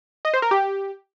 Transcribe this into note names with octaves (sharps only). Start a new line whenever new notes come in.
D#5
C5
A#4
G4